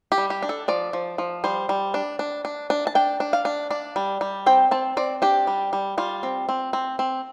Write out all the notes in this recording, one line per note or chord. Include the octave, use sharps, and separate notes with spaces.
G4
G3
G4
D4
A4
F3 D5
F3
F3
G3 C5
G3
D4
D4
D4
D4
A5
D4 G5
D4
F5
D4
D4 D5
G3
G3
C4 G5
C4 A5
C4 D5
D4 G4
G3
G3
G3 F4
C4
C4
C4
C4